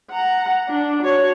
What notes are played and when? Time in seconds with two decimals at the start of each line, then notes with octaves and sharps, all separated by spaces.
0.11 F#5 A#5
0.68 D4
1.03 F#4 C#5